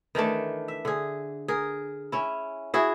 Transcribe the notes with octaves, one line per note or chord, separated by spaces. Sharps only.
D#3 E3 A3 D4
E5
D3 G#4
G#4 A#4
C#4 E4
E4 F#4 G#4